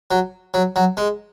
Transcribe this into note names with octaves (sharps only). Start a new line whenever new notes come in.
F#3
F#3
F#3
G#3